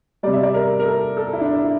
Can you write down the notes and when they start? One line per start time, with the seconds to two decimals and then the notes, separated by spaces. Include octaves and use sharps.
0.23 C3 G3 D5
0.33 E5
0.43 D5
0.54 A#4
0.79 A#4
0.86 A4
1.17 A4
1.33 E4
1.41 D4
1.64 E4